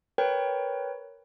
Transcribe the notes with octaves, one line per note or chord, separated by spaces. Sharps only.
A#4 B4 C#5 G5